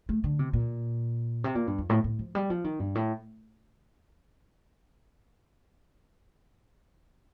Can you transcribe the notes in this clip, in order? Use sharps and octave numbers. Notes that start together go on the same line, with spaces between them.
A3
D3
C3
A#2
C3
A#2
G2
F2
A2
A2
F3
G3
F3
D#3
G2
A2